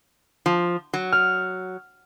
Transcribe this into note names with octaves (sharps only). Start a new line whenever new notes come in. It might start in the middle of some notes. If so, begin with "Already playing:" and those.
F3
F#3
F6